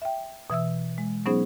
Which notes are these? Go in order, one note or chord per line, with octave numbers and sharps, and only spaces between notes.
E5 G5
B2 E3 E5 E6
G#3
F#3 B3 C#4 D#4 G#4 C5